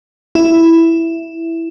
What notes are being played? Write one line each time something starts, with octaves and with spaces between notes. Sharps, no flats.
E4